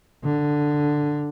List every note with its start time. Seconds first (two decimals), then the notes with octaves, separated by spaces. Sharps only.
0.24 D3